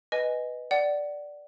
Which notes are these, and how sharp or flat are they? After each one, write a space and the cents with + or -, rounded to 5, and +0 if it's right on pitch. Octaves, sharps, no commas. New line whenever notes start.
B4 +0 D#5 +0 G#5 +0
D5 +0 F#5 +25